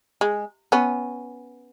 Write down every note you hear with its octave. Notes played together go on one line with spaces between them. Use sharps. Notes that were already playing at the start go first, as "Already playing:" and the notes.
G#3
B3 C#4